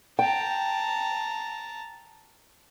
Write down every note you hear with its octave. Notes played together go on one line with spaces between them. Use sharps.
G5 A5 A#5